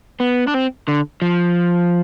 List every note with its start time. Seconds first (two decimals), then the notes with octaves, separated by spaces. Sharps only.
0.20 B3
0.48 D4
0.55 C4
0.88 D3
1.22 F3